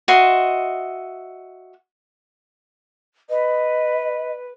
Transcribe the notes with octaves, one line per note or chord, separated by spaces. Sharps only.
F#4 D#5 E5 C6
B4 D#5